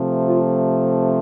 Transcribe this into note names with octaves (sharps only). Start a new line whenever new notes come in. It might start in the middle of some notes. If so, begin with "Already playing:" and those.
Already playing: C3 F3 A3
F4